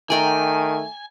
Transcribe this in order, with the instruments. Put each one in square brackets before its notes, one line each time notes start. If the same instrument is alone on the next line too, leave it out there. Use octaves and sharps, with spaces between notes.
[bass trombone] D#3 [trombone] A3 [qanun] D5 G5 A#5 [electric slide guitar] G#5